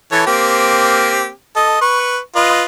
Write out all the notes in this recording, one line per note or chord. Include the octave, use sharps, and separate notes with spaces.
E3 A4 C#5
A#3 C4 G4
A4 D#5
B4 C#6
F4 B4 D#5